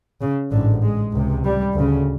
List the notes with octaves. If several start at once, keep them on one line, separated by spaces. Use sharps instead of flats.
C#3
A1 G#2 D3
G#3
C#2 C3
G3
D2 C#3